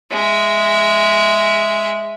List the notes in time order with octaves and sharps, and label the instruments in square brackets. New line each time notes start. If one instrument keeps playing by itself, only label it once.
[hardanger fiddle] G#3 E5